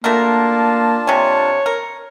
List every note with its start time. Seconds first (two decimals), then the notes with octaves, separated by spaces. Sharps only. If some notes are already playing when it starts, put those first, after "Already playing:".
0.04 A3 A#3 D4 F4 F#4 A#4 A5
1.07 C3 C#5 G#5
1.66 A#4